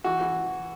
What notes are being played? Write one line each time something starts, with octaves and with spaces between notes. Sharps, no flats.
E3 F#4
E3